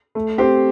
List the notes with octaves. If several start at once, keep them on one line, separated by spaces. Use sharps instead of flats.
A3
C4 G4 C5